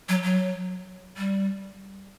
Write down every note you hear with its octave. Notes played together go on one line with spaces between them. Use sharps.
F#3
F#3
G3